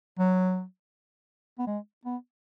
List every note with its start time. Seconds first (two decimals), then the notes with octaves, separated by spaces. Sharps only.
0.19 F#3
1.59 B3
1.67 G#3
2.05 B3